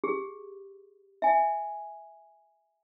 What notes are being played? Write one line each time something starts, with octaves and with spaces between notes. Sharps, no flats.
G4 G#4
E5 G#5